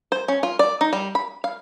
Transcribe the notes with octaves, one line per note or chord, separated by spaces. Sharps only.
C5
C#4
F4
D5
D#4
G3
B5
F5